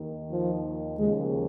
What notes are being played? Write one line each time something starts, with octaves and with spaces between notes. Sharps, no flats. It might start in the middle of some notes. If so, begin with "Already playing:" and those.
Already playing: D#2 D#3
F3
D#2 C#3 F3 G#3